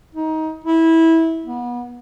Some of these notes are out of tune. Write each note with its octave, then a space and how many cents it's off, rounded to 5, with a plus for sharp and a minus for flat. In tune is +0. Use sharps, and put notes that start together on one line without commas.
D#4 +20
E4 -15
B3 -30